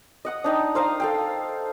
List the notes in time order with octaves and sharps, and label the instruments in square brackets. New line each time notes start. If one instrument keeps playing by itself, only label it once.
[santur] D#5 F#5 D#6
D4 D#4 G5
C5 F5 A#5 D#6
A4 F5 G5